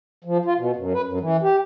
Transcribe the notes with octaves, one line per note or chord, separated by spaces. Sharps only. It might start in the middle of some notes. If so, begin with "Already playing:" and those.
F3
F4
B2
F#2
B4
F#2
E3
G4